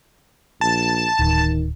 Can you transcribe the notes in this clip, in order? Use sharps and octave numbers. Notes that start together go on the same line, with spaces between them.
A#1 A5
D1 D#3